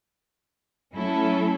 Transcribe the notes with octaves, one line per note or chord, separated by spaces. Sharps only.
F#3 A3 C#4 E4 A4